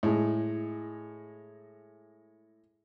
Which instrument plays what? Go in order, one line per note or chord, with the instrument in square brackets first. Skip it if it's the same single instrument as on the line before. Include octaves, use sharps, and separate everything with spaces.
[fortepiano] A2 G#3